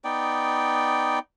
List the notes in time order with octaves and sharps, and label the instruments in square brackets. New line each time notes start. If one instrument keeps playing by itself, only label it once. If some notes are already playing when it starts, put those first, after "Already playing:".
[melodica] B3 D#4 D5 G5